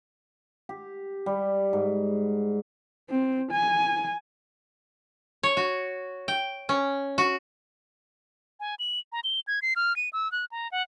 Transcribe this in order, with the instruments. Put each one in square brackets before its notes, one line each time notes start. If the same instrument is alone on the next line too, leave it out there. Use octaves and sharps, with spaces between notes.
[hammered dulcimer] G4
G3
G#2
[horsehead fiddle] C4
G#5
[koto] C#5
F#4
G5
C#4
F#4
[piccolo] G#5
F#7
A#5
G7
G#6
C7
F6
D#7
E6
F#6
A#5
F#5